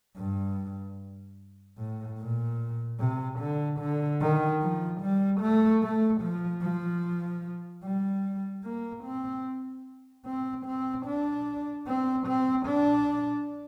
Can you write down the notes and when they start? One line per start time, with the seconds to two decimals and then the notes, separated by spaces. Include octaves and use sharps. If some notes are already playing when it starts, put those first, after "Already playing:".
0.17 G2
1.78 A2
2.19 A#2
2.99 C3
3.40 D3
3.80 D3
4.21 D#3
4.61 F3
5.02 G3
5.41 A3
5.82 A3
6.22 F3
6.62 F3
7.84 G3
8.64 A#3
9.04 C4
10.26 C4
10.66 C4
11.07 D4
11.87 C4
12.27 C4
12.67 D4